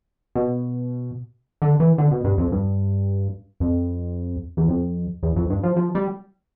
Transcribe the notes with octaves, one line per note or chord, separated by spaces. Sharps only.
B2
D3
E3
D3
B2
G2
F2
G2
F2
E2
F2
E2
F2
G2
F3
F3
G3